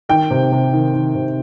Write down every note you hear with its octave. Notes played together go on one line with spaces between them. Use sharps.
D#3 G5
C3
C3
D#3
D#3
C3